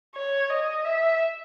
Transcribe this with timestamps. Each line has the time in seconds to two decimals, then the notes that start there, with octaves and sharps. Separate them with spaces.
0.15 C#5
0.50 D#5
0.85 E5